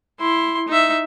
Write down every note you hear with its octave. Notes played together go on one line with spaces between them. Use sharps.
E4 C6
D#4 E5